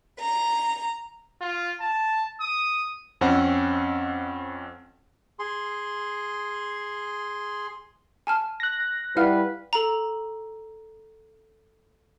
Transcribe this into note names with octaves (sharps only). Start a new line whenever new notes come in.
A#5
F4
A5
D#6
F2 C4 C#4 F#5
G#4 C6
G#5 A5 F6
F#6 A#6
G3 E4 B4 F5 F#5 F6
A4 A#5